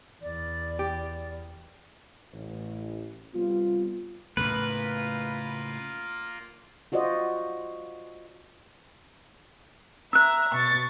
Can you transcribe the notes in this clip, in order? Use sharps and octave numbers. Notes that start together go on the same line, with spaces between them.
E2 D5
G4
A1
C3 G3 B3 F4
A2 C#3 A3 A#3 F4 B4
F4 F#4 C5 D5 D#5
E5 A#5 E6 F#6
B2 C#6 A6